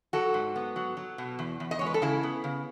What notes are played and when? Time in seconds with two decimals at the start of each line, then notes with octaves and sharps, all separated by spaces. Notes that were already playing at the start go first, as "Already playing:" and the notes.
0.13 F#3 F#4 A4
0.34 G#2
0.56 B3
0.76 F#3
0.97 F#3
1.18 B2
1.39 E2
1.60 E2
1.71 D#5
1.79 G#3 C#5
1.86 B4
1.94 A4
2.02 C#3 E4 G#4
2.23 B3
2.44 C#3